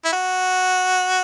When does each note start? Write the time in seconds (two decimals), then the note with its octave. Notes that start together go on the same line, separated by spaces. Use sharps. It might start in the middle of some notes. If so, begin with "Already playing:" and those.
0.05 E4
0.13 F#4